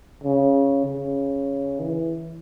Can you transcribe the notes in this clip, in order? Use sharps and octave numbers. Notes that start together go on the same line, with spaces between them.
C#3
C#3
E3